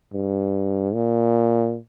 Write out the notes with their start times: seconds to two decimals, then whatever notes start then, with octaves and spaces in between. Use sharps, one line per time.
0.13 G2
0.94 A#2